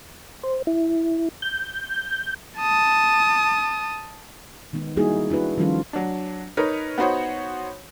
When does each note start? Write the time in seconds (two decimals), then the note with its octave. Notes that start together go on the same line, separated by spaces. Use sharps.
0.43 C5
0.67 E4
1.42 G6
2.59 A5 D#6
4.73 D#3 G#3 B3 D#4
4.96 G3 A#3 D#4 E4 F#4 G#4
5.30 D4 E4 F#4 B4
5.58 D#3 F3 G3 C#4 F4 A4
5.93 F#3 D4
6.57 D#4 A#4 B4 C#5
6.98 B3 D#4 F#4 C5 C#5